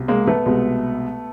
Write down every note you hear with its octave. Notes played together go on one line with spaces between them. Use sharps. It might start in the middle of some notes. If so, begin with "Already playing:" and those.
Already playing: C2 B2
G#3 A#3
A3 B3
C2 B2 G#3